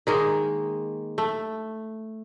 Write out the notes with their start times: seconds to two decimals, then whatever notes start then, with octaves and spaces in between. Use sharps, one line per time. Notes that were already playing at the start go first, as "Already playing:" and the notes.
0.07 D#3 G#3 A#3
1.18 A3